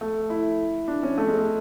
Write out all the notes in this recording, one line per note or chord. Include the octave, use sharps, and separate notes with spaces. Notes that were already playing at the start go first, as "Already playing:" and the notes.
A3
E4
D4
C#4
A3
G#3
G#3